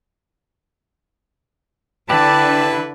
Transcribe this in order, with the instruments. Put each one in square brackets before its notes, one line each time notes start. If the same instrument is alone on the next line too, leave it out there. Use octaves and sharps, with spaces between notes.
[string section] D3 [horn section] E4 B4 [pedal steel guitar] G4 D5 [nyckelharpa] A5